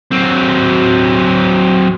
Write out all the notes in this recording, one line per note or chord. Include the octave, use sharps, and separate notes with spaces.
F#3 C4